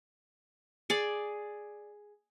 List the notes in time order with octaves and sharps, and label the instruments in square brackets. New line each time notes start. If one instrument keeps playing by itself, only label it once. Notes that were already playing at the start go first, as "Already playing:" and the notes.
[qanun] G#4 D5